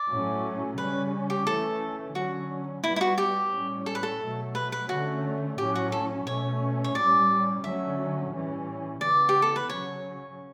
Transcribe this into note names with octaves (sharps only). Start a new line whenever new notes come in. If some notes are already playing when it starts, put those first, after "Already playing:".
Already playing: D5
A2 F#3 A3 C#4
C#3 G3 C#4 B4
G4
E3 A3 C#4 A4
D3 F#3 C#4 F#4
A2 G3 B3 E4
E4
F#4
G4
A2 G3 C#4
A4
B4
A4
B2 F#3 A3
B4
B4
D3 A3 C#4 F#4
A2 F#3 C#4 G4
F#4
A4
B2 A3 C#4 C#5
C#5
A2 G3 C#4 D5
D3 F#3 A3 C#4 E5
A2 E3 G3 C#4
C#3 E3 B3 D5
G4
A4
B4
C#3 F#3 C#4 C#5